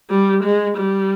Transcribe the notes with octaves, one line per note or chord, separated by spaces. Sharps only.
G3
G#3
G3